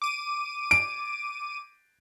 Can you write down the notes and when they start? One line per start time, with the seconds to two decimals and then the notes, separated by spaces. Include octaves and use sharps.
0.02 D6 D#7
0.71 D7